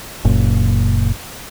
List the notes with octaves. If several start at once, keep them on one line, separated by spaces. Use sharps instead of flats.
F#1 A#2